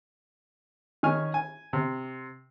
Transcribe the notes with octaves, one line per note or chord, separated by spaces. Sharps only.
D#3 C#4 G#5 F6
G#5
C3